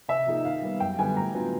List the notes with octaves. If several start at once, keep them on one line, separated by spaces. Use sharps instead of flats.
C3 E5
F3 A#3 D#4 G#4
D#3 F5
G3 B3
F#2 G5
D3 G3 B3 G#5
A2 A#5
F#3 B3 D4 F4